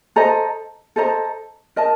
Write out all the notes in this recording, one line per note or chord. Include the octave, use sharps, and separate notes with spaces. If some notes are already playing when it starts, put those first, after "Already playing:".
A4 C5 D#5 A#5
A4 C5 D#5 A#5
A#4 D#5 A5